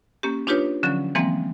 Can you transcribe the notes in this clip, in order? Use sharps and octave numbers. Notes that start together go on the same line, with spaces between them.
A#3 C#4 G4
D4 D#4 F4 G4 B4 C#5
D3 F3 F#3 C#4
E3 F3 G3 G#3 A#3 C4